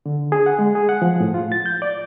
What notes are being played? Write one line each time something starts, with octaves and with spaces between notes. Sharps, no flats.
D3
G#4
F#5
G#3
G#4
F#5
F3
A2
F4
A6
G6
D5